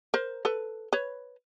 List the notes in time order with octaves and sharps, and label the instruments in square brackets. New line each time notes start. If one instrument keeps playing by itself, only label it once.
[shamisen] A#4 C5
A4 B4
B4 C#5